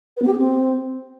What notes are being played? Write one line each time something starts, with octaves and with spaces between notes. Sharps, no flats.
B4
B3
G4
G#4
C4